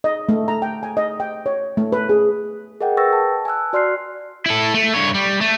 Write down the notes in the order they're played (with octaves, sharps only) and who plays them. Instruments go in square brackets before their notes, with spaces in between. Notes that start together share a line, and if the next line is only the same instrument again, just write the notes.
[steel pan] D#5
A3
A#5
G5
G#5
D#5
G5
C#5
A3
B4
G#4
[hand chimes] G#4 A#4 D#5 F#5 G5
B4 G5 C#6 E6 A6 A#6
A5
G#5 A5 E6 F#6
F#4 D5 C6 F6 F#6 C7
[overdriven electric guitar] E4 A4
A3
G2 C#5
G3
A3